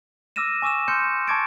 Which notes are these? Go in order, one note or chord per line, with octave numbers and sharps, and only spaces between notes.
D6 E6 F6 A#6 D#7 E7
G#5 C#6 D6 E6 E7
C6 F6 G6 C#7
A5 C#6 D6 G#6 A6 D7